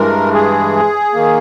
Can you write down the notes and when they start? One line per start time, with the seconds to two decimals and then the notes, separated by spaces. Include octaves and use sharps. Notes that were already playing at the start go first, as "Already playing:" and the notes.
Already playing: G2 E3 G#3 A#4
0.34 G#4
1.14 D#3 A#3